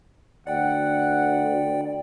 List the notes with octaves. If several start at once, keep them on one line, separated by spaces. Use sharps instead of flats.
D2 D5 F#5 G5